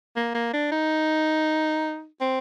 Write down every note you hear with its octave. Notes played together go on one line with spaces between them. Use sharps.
A#3
A#3
D4
D#4
C4